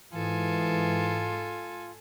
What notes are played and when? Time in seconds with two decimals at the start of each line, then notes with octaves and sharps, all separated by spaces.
0.13 G#2 E3 G#3 F4 A4 G#5